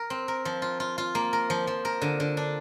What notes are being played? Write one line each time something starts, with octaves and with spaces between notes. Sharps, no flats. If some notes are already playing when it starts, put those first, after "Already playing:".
Already playing: A#4
C4
A#4
F3
F4
F4
F4
A#3
A#4
F3
F3
A#4
D3
D3
D4